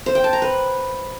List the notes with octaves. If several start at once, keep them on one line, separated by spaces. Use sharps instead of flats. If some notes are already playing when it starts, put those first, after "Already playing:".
C5
G5
A5
A#5
B4